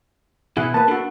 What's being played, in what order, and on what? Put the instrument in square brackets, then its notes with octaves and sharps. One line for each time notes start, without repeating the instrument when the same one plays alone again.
[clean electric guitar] B2 E3 [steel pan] E4 G#4 F#5
[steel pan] A#3 B4 [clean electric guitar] A5
[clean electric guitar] D4 [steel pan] F#4 A4